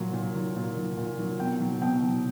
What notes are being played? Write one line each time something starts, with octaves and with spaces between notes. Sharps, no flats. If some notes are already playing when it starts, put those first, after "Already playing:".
Already playing: A#2 F#3
A#2
F#3
A#2
F#3
A#2
F#3
B2 G5
F#3
B2 G5
F#3